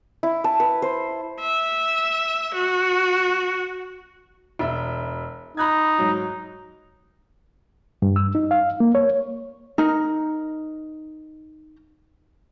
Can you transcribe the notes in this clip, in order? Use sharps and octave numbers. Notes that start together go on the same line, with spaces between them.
E4
A5
B4
C5
E5
F#4
E1 E5
D#4 B5 F#6 G#6
G#2 F#3
G2
E6
D#4
F5
A#3
C#5
D#4 A#4